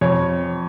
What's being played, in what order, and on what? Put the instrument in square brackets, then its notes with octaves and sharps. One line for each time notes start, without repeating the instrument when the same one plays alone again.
[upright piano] F2 C#5